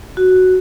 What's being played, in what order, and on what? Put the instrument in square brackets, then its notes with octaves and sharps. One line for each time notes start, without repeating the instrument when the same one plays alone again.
[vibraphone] F#4